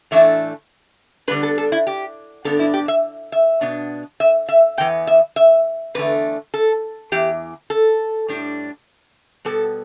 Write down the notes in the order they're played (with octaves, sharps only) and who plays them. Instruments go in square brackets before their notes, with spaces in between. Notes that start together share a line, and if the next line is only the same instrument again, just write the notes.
[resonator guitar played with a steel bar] A2 E3 A3 D4 E5
D3 G3 B3 D4 B4
A4
A4
E4
G4
G2 D3 B3 D4 A4
E4
G4
E5
E5
B2 B3 D4
E5
E5
E2 E3 B3 G5
E5
E5
E2 D3 A3 B4
A4
E2 E3 G4
A4
A2 G3 D4
B2 G3 B3 A4